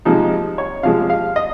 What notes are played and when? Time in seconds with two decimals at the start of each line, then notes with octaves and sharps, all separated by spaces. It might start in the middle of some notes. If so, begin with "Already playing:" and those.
0.05 C3 F3 G#3 D#4
0.58 C#5
0.83 C3 F3 G#3 F5
1.10 F5
1.36 D#5